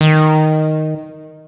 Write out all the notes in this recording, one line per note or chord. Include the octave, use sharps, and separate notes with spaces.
D#3